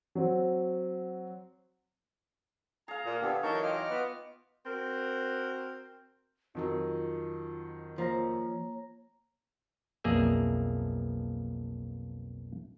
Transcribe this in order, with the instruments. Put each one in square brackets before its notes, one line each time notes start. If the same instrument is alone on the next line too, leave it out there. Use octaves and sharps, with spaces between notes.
[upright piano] F#3 C4
[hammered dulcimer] G#4 F5 [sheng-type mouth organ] A#5
[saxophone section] A#2
[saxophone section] D3 [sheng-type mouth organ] B3 G4 A4
[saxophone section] E3 F#3 D#4 [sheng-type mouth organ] A#4 A5 G6 [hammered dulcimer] C#6
[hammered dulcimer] F4 G5 [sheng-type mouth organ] D#5 D6 F6
[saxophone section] B3
C4 F#4 A#4
[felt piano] F2 D#3 F#3 [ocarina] F4
[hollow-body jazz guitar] F3 [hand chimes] A#3 A#5 A#6 [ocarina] C#5
[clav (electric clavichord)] B1 F2 A#3 G#4 D5 E5